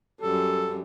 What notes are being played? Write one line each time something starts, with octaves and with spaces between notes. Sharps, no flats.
F#2 G3 A4